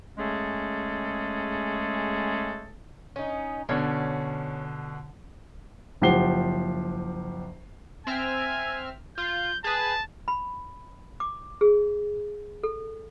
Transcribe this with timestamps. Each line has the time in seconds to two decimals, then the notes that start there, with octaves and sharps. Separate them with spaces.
0.18 C#3 G#3 A3 C#4 G#4 A4
3.16 C#4 D#4
3.69 B2 D3 C#4 C#5 D5
6.02 F#1 F3 G4 F#5 C7 G7
8.07 C4 E5 G#5 F6
9.18 F4 G6
9.64 G#4 B4 A5
10.28 B5
11.20 D6
11.61 G#4
12.63 A4